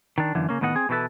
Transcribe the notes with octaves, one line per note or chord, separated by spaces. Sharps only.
D#3 D4
F#2 D3 E3 A#3
C#3 A#3 C#4
A2 D#3 B3 D#5 F#5
C4 G#4
B2 E3 C4 E4 A4 B4